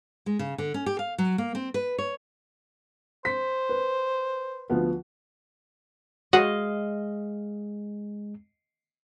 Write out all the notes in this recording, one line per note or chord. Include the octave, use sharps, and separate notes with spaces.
G#3
C#3
D3
C#4
G4
F5
F#3
A#3
C4
B4
C#5
C5 B6
B4
D2 F3 B3
G#3 F#4 D#5 F5